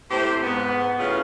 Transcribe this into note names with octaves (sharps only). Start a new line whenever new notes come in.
A2 C3 G4 C5
G#2 B3
A2 C#3 F#3 C#4 F4 G#4